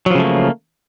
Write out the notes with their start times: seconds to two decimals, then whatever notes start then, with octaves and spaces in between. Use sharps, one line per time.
0.06 F#3
0.10 F3
0.15 C#3
0.19 A3
0.24 A#3